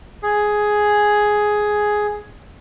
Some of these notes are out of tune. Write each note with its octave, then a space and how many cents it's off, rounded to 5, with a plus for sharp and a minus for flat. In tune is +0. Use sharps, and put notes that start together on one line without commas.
G#4 +5